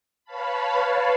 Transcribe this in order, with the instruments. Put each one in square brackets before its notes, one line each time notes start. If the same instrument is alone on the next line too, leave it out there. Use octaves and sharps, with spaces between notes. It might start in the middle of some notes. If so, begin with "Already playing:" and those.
[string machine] B4 C#5 F5 A5 B5